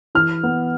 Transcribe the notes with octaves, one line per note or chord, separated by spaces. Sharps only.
E3 F6
B3